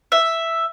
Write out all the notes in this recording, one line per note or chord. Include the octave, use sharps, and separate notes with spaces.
E5